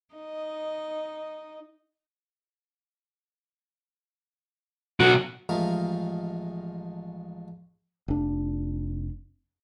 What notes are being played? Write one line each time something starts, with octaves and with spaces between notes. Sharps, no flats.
D#4 D#5
B2 F#3 F#4
A1 F3 G#3 A3 A#4 F5
F1 D4